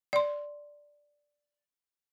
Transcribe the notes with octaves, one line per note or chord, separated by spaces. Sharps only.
D5 C6